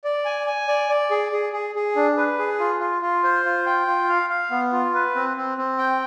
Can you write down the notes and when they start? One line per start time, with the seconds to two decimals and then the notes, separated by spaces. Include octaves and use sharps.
0.04 D5
0.25 G#5
0.47 G#5
0.68 D5
0.89 D5
1.11 G#4
1.32 G#4
1.53 G#4
1.75 G#4
1.96 D4
2.17 B4
2.39 G#4
2.60 F4
2.80 F4
3.02 F4
3.24 C5
3.45 F4
3.66 G5
3.87 F4
4.09 F5
4.30 F5
4.51 B3
4.72 F4
4.94 B4
5.15 C4
5.37 C4
5.58 C4
5.79 G5